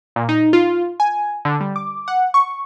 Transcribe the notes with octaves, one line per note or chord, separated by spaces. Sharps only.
A#2
D#4
F4
G#5
D3
G3
D6
F#5
C#6